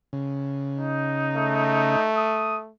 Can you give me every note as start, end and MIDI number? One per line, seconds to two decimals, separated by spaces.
0.13 1.96 49
0.78 2.09 63
1.36 2.72 57
2.15 2.56 87